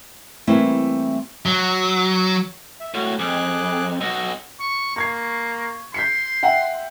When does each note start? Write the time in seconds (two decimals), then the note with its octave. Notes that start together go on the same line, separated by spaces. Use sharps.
0.47 E3 G3 A3 A#3 C4 E4
1.46 F#3
2.80 E5
2.94 A2 F#4
3.19 F2 G#4 D6 F#6
4.00 B1 F#4 D#5 E6
4.60 C#6
4.96 A#3 C#6 G#6 C7
5.94 C6 G6 B6 C#7
6.43 E5 F#5 G5